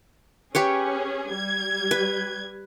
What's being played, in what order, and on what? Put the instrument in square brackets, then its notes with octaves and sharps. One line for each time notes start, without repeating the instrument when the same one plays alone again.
[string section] C#4 G#4 [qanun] G4 B4 C#5
[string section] G3 G#6
[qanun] B4